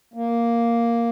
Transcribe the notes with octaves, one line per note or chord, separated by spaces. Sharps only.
A#3